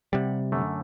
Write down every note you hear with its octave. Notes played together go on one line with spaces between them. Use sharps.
C3 G3 F#5
F#2 D3 A3